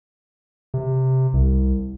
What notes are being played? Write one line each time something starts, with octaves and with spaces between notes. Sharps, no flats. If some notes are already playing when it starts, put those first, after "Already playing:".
C3
C2